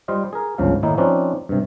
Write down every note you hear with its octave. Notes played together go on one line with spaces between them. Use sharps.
G3 F4 C5 D#5 F5
G#4 A#4
G1 C#2 C#3 F3 F5
A2 D#3 A#3 D#4 E4
F3 C4 C#4 D#4 B4 D5
G2 C3